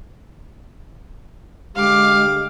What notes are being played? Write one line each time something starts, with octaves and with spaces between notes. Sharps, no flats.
D3 G#3 G4 F5 D6